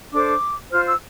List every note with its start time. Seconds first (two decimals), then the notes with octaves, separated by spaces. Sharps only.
0.12 D4 A4 C5 D6
0.72 F4 C5 F6
0.86 E6